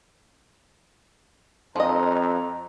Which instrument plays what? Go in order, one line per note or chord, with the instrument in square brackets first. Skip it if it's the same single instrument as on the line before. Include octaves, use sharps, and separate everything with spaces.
[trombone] F2 [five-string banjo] F3 D#5 [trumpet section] A#5